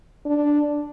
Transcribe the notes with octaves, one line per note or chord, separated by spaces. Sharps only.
D4